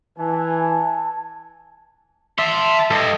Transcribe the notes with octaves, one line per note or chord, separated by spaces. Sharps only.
E3 G#5 A5
E5 A5 C6
G2 A4 D#5